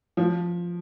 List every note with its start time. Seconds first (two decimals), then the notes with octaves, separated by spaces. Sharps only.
0.17 F3